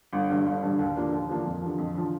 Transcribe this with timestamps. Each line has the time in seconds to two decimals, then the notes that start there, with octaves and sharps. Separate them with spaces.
0.13 G1
0.30 G2 D3
0.46 G1
0.63 G2 D3
0.79 D#2
0.96 D3 F3 A#3 D4
1.13 D#2
1.29 D3 F3 A#3 D4
1.45 F2
1.62 D3 F3
1.78 F2
1.95 D3 F3